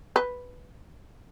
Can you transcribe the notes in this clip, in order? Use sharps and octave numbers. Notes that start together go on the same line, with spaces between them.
B4